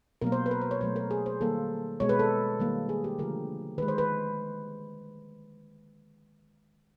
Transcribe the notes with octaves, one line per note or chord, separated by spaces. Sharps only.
B2 F#3 A#3 A#4
C5
B4
A#4
C5
C#5
B2 F#3 A3 C5
A#4
G#4
C5
D#3 G3 A#3 A4
B2 G#3 C#5
B4
A4
D#3 G3 A#3
G#4
G4
D3 F3 A3 A#4
D#3 G#3 B4
C5
B4